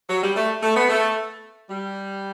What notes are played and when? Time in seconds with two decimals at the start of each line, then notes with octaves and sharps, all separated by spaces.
0.08 F#3
0.22 G3
0.36 A3
0.62 A3
0.75 B3
0.89 A3
1.69 G3